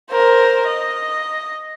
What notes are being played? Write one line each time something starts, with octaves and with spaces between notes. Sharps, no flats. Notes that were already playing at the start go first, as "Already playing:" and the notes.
A#4 C5
D#5